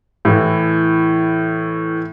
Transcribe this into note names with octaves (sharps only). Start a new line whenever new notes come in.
A2 E3